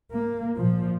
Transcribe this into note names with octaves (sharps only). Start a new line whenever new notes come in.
A#3
A#2 F3